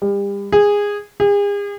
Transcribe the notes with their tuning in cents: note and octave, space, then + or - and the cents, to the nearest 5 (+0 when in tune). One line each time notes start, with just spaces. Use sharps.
G3 +35
G#4 -15
G#4 -40